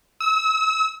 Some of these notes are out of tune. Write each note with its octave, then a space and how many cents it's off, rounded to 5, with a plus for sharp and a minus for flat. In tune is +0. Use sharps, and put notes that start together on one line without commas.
E6 -35